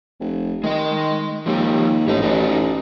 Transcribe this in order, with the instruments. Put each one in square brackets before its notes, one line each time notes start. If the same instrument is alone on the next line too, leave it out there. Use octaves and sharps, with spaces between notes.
[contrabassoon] F1
[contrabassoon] D#3 [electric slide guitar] G#3 D#5
[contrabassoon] D#2 [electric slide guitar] F3 G#3 G4
[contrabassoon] A1 [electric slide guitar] G#2 D#4 D#5
[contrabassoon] A1 [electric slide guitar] D#4 F#4 D5